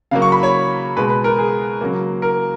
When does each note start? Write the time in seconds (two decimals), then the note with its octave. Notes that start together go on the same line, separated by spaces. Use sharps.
0.11 C#3 F#3 A#3 F5
0.22 C#6
0.32 B5
0.43 C#5
0.96 B2 G#3 B4
1.10 B4
1.24 A#4
1.38 G#4
1.81 C#3 F#3 A#3
2.22 A#4